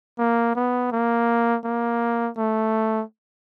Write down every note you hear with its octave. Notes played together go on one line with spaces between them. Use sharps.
A#3
B3
A#3
A#3
A3